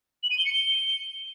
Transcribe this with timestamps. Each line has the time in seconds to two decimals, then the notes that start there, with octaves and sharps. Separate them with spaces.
0.23 F#7
0.31 D#7
0.38 G7
0.45 C#7
0.53 G7